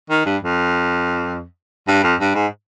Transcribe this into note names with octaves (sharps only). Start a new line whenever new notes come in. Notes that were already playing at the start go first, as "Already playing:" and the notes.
D#3
G2
F2
G2
F2
G2
G#2